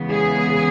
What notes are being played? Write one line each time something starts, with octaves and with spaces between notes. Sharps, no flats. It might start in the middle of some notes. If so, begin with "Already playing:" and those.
Already playing: E2 C#3 G#3 B3
G#4